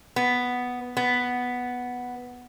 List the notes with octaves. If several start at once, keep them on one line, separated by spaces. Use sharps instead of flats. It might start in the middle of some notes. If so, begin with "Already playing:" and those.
B3
B3